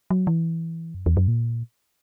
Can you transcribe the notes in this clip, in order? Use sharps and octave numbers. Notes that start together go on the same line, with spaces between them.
F#3
E3
F#2
E2
F#2
A#2